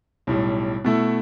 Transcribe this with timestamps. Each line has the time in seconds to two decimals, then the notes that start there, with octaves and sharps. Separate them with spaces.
0.27 B1 A2 G3
0.84 B2 A3 E4 A4